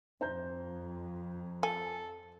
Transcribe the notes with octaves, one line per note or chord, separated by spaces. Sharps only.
F2 C5 A#5 G6
A4 G#5